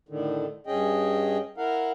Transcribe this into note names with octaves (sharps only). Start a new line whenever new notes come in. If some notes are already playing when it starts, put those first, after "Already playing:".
A2 D3 D#3
G2 C#4 G#4 D#5 G5
E4 A#4 F5 F#5